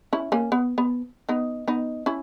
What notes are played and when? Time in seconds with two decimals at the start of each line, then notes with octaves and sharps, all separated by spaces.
0.13 C#4 E4
0.32 A#3 C#4
0.52 B3
0.78 B3
1.29 B3 D#4
1.68 B3 D#4
2.06 C#4 E4